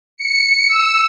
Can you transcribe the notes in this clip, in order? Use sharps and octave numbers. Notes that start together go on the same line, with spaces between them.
C#7
E6